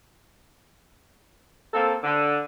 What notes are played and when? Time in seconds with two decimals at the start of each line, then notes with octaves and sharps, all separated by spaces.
1.74 A#3 C4 A4
2.03 D3